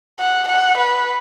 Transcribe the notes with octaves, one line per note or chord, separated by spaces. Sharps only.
F#5
F#5
B4